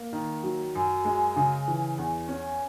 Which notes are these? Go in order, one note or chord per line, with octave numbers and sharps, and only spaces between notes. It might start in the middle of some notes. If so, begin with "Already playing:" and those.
Already playing: A#3
D#3
F#3
F#2
G#3
C#3
E3
E2
C#4